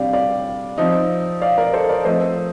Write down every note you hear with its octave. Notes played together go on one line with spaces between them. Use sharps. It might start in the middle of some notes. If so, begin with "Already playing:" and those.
Already playing: C3 G3 D4 D5 F5 G5
D5 F5
F3 C4 D#4
D5 F5
A#4 D5
A4 C5
A#4 D5
F3 A3 C4 C5 D#5